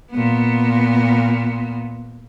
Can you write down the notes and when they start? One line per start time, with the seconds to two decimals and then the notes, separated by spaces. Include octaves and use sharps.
0.11 A#2 B3